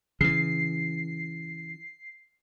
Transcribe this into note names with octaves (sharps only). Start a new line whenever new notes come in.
C#3 E3 C7